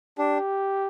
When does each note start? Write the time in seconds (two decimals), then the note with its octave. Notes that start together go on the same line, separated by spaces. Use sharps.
0.18 D4 G4